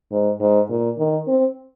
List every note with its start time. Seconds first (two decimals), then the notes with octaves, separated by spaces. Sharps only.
0.12 G#2
0.40 G#2
0.69 A#2
0.98 D#3
1.27 C4